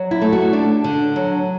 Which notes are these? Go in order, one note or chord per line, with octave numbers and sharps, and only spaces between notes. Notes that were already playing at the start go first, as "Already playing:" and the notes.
Already playing: F#3
E4
A3
F#4
D4
D3
F#3